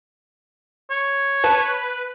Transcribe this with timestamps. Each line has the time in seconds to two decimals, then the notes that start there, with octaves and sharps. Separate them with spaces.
0.90 C#5
1.44 B4 A5